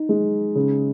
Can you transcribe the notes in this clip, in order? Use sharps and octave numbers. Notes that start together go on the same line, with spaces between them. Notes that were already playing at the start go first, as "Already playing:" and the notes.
Already playing: D#4
G#3
C#3